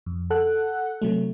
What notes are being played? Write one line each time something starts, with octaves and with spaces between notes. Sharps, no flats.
F2
A4 F#5 F#6
C3 F#3 A3